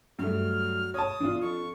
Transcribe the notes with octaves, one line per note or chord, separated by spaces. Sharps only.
G2 F#3 A3 F6
C#5 A5 D#6
E2 D4 F4
F2 C#6